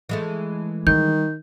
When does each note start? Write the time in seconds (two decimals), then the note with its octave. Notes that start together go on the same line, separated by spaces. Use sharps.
0.09 E3 G#3 A3
0.87 D#3 G3 G6